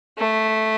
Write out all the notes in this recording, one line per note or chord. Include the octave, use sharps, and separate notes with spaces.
A3